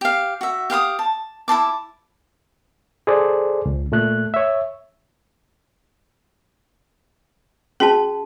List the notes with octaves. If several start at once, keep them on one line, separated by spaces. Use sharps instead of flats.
G4 F5
F#4 E5
G4 F5 C6 D#6
A5
E4 C5 A5 D6
G#4 A4 C5 D5
C#2
A#2 A3 F#6
C#5 E5
C#4 F#4 G#4 G5 A5